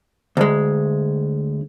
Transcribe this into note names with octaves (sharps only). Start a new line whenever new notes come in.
D2 G#3